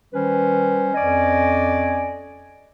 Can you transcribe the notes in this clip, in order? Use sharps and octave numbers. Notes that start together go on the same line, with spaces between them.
D#3 G3 C#4 B4 C5
F2 C#4 D5 D#5 G#5